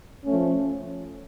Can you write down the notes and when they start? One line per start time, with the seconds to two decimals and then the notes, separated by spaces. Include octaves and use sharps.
0.24 F3 A3 C#4